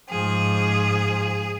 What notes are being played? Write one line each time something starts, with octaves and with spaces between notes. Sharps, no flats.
G#2 F3 G#4